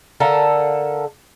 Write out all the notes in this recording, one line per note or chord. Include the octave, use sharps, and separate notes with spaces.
D3 A4 A#4 F5